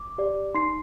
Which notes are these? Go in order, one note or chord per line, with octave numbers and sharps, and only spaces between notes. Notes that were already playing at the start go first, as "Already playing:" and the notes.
Already playing: D6
G4 D5
D#4 C6 C7